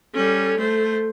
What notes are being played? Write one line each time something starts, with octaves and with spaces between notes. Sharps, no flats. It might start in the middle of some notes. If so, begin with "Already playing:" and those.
G3 C#4 A4
A3 C5